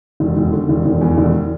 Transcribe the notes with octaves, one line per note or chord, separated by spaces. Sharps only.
E1
E1
D3
E1
E1
E2
E1